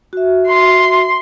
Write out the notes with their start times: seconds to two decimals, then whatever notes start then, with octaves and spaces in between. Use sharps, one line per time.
0.13 F#4 E5
0.47 C6